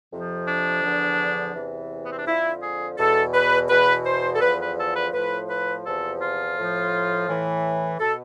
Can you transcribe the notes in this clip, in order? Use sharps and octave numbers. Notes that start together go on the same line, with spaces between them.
F2 C3 F3
D4
E2 D3 F3
E2 C3 E3
B3
C4
D4
F2 D3 F3 E4
G#4
E2 B2 A4
B4
E2 B2 B4
C5
A4
E2 D3 F3 B4
B4
A4
B4
A2 F3 B4
B4
E2 C3 F3 A4
F4
A2 F3
A2 E3
B2 A4